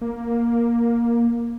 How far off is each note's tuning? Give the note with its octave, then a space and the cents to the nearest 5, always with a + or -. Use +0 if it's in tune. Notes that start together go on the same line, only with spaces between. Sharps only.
A#3 +10